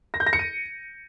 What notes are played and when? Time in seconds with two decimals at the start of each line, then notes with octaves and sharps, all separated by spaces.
0.14 A#6
0.20 G6
0.27 A#6
0.33 C#7
0.39 D#7